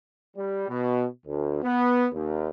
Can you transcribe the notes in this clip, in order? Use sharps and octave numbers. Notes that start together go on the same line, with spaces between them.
G3
B2
D2
B3
D#2